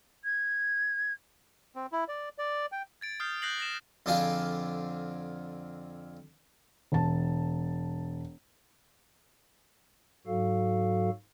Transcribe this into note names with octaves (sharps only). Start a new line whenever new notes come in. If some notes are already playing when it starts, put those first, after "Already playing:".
G#6
C4
E4
D5
D5
G5
G#6 A6 D7
D#6 F6 G6 C7
F#6 G6 A#6 C7 F#7
A#6 E7
F2 D3 D4 F4 G#4 F5
E1 A5
G#2 F#3 F#4 A4 F5